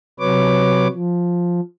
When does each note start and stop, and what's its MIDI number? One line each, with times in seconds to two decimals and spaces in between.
0.20 0.88 48
0.20 0.88 54
0.20 0.88 71
0.20 0.88 73
0.20 0.88 86
0.93 1.60 53